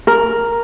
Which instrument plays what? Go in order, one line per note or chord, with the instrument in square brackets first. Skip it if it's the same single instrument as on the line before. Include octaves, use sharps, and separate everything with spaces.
[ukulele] A#4